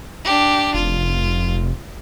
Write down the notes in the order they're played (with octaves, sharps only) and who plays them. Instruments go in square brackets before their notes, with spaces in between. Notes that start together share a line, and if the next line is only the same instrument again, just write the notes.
[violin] D4 G4
[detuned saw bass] F1 [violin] F4